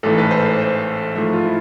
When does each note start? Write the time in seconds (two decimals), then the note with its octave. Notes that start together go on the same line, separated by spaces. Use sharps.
0.03 A1 G#2 E3 A3 A4
0.18 B4
0.31 C5
0.45 C5
0.59 C5
1.16 G#2 F3 A3
1.33 F4
1.45 E4